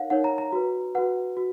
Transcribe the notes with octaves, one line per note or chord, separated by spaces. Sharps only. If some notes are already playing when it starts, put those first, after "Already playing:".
Already playing: D#4 A#4 C#5 F5 F#5
D#4 A#4 C#5 F#5
A#5
A#5
F#4 B4
F#4 B4 F#5
F#4